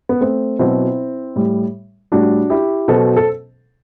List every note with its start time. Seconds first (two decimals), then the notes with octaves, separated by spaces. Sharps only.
0.09 B3
0.21 A3 C4
0.59 B2 F#3 C4 E4
1.36 A2 G3
2.12 A2 G3 D4 F#4
2.50 E4 G4
2.88 B2 F#3 A4 C5
3.17 A4